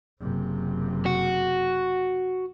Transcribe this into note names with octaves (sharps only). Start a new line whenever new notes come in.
F#1 C3
F#4